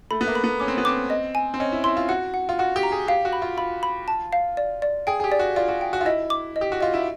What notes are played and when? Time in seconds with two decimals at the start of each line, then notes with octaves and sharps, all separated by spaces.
0.11 A3 B5
0.21 B3
0.27 A#3
0.35 B5
0.44 B3
0.60 C#4 D6
0.68 C4
0.78 B3
0.85 C4 D6
1.10 D#5
1.35 G#5
1.54 C4
1.60 C#4 D#5
1.72 E4
1.84 E4 C6
1.97 F4
2.09 F#4 F#5
2.34 F#5
2.49 F4
2.59 F#4 F#5
2.76 G4
2.83 A#5
2.92 G#4
3.08 G4 F5
3.25 F#4
3.33 B5
3.42 F4
3.57 F4 B5
3.83 B5
4.08 A5
4.33 F5
4.57 D5
4.82 D5
5.07 G#4 G5
5.20 G#4
5.24 G4
5.32 D5
5.39 F#4
5.56 F4 D5
5.69 F#4
5.81 G5
5.93 F#4
6.01 F4
6.05 E4 D#5
6.30 D6
6.56 D#5
6.61 G4
6.72 F#4
6.81 F4 D#5
6.94 E4